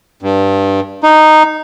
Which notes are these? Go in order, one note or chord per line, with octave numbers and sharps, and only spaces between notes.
G2
D#4